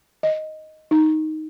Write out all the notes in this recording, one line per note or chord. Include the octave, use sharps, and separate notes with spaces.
D#5
D#4